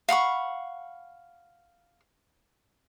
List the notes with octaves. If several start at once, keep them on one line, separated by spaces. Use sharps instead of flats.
F5 F#5 B5 C#6